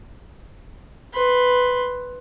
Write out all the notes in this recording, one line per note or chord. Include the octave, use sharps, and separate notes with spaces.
B4 C6